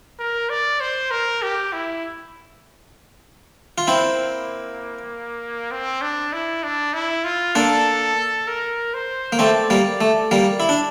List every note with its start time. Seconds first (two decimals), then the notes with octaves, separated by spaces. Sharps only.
0.19 A#4
0.49 D5
0.81 C5
1.11 A#4
1.42 G4
1.73 E4
3.78 F4
3.87 A#3 C4 E4
5.71 C4
6.02 D4
6.33 E4
6.63 D4
6.94 E4
7.24 F4
7.55 A#3 D4 A4
8.47 A#4
8.94 C5
9.32 A#3
9.39 A3 C4 D5
9.70 G3 A#3
10.01 A3
10.31 G3 A#3
10.60 E4
10.69 D4